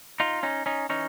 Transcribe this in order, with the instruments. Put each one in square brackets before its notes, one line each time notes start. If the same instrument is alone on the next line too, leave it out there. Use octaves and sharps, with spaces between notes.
[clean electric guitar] D#4 F4
C#4 D#4
C#4 D#4
E3 C#4 D#4